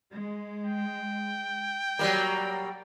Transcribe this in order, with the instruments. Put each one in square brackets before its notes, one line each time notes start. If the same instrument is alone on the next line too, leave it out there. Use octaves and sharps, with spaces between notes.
[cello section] G#3
[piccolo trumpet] G5
[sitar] F#3 G3 A#3 [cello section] D5